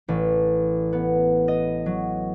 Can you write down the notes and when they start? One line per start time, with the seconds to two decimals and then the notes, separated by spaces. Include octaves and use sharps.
0.08 A1
0.93 B3
1.48 D#5
1.86 F#3